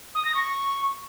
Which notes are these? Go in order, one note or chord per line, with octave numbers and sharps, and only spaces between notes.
D#6
A#6
C#6